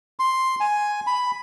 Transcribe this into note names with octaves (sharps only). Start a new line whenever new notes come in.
C6
G#5
B5